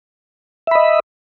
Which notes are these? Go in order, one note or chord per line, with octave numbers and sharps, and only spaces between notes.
D#5 E5 B5